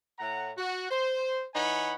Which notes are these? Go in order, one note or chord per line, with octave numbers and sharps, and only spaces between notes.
A2 F#5 A#5
F#4
C5
E3 D#4 C#5 F#5 G#5 B5